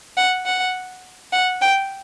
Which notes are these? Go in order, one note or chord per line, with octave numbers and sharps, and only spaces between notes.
F#5
F#5
F#5
G5